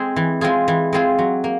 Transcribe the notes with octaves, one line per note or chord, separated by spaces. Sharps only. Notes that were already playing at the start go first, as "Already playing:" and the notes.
Already playing: G#3 C4 G#4
E3
G#3 C4 F4 G#4
E3
G#3 C4 F4 G#4
F#3
A#3